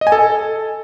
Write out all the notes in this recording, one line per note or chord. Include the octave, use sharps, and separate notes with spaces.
D#5
G#5
A4